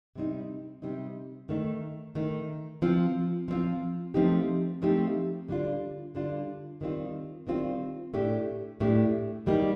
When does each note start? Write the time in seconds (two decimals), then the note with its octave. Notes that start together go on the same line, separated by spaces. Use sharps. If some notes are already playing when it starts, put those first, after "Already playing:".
0.15 C3 G3 C4 D#4
0.82 C3 G3 C4 D#4
1.49 D#3 A3 D#4
2.15 D#3 A3 D#4
2.82 F3 C4 F4
3.48 F3 C4 F4
4.14 F3 A3 C4 D#4 G4
4.82 F3 A3 C4 D#4 G4
5.48 D3 G3 D4 F4
6.15 D3 G3 D4 F4
6.81 D#3 G3 C4 F4
7.47 D#3 G3 C4 F4
8.14 A2 A3 D4 G4
8.80 A2 A3 D4 G4
9.46 D#3 G3 A#3 D#4 G4